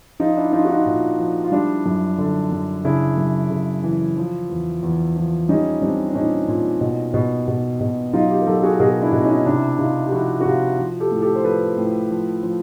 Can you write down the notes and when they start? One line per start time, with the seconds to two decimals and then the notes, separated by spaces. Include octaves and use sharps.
0.20 F3 D#4 F4
0.37 D4 E4
0.52 F3 D#4 F4
0.65 F#4
0.70 D#4 F4
0.86 A#2
1.19 F3
1.44 F4
1.52 G3 D4 E4
1.86 F#2
2.18 D3
2.52 F#2
2.85 C#3 D4 E4
3.17 F#2
3.51 C#3
3.84 E3
4.17 F3
4.50 E2
4.83 E2
5.16 F3
5.49 G3 C#4 D#4
5.82 G3 C4 D4
6.09 D4
6.15 A#2 C#4 D#4
6.48 A#2
6.81 B2
7.14 B2
7.48 B2
7.81 B2
8.13 F#3 D#4 F4
8.30 F4 G4
8.41 A#4
8.46 F#3 G4 A4
8.63 F#4 G#4
8.80 B2 G#4 A#4
9.02 D4 E4
9.12 B2
9.24 C#4 D#4
9.46 C3 D4 E4
9.79 C3 D#4 F4
10.06 G4
10.12 F3 E4 F#4
10.41 F#4
10.45 C3 F4 G4
10.78 F3
11.00 G4 A4
11.11 A2
11.22 G4 A4
11.36 C5
11.44 F3 A4 B4
11.77 A2
12.10 F3
12.43 F3